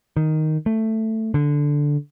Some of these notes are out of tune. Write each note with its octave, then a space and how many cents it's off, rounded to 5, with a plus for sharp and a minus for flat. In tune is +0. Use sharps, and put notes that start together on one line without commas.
D#3 +0
A3 +10
D3 -5